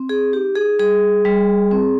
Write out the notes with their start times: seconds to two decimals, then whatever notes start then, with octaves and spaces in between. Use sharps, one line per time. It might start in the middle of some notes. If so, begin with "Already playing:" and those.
Already playing: C4
0.09 G#4
0.32 D#4 G4
0.56 G#4
0.79 G3 G#4
1.25 G3
1.71 C4